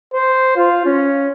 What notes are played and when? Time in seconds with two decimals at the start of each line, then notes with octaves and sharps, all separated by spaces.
0.14 C5
0.56 F4
0.86 C#4